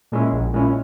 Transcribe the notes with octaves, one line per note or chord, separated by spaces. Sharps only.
A#2 G#3 C#4 E4
A#1
A#2 G#3 C#4 E4